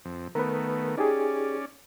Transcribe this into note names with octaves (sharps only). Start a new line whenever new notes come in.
F2
D#3 A3 B3 A#4 B4
C#4 D#4 G4 G#4 D5